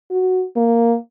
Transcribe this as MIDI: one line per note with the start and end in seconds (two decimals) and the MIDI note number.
0.11 0.43 66
0.56 0.96 58